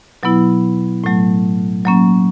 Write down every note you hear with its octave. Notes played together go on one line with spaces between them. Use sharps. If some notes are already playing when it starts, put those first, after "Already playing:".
B2 F#3 B3 E4
A2 F#3 A3
F#3 A#3 C#4